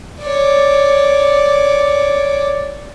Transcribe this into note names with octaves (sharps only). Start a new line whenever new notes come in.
C#5 D5